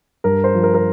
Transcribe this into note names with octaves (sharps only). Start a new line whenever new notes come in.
G2 A#4
C5
F3
A#4
A#4